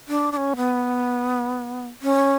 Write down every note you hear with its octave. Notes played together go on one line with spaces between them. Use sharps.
D4
D4
C#4
B3
C#4